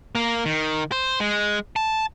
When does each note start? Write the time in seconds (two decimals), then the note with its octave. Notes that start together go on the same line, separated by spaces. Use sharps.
0.15 A#3
0.45 D#3
0.92 C5
1.20 G#3
1.76 A5